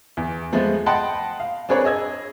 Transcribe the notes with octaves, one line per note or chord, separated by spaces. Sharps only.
E2
F3 G#3 A3 B3
D#5 F#5 G5 A5 B5 C6
F5
C4 D4 G#4 A#4 B4 C#5
G#4 D#5 E6 G#6